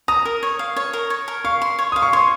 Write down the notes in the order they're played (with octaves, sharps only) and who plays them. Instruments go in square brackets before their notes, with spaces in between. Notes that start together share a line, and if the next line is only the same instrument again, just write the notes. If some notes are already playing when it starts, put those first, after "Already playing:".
[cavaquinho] A#5 [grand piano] D#6
[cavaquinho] A#4
C#5
F5
C#5
A#4
C#5
A#4
[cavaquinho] F5 [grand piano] C#6
[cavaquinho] C6
C#5
[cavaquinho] F5 [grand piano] D#6
[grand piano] C#6
[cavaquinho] C#5 [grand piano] C6